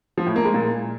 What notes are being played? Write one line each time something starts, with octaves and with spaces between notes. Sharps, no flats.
F3
A2
A#3
G#3
A#2